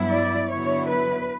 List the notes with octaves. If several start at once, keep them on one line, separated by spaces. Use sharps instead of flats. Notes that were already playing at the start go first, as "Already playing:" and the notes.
Already playing: G2 F#3 B3 E4
D5
D3 F#3 B3 E4 C#5
B4